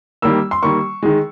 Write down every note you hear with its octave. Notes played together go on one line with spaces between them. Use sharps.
D#3 G3 A#3 E6
C6
D#3 G3 A#3 C#6
D#3 G#3